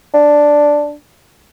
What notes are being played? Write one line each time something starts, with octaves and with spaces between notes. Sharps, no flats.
D4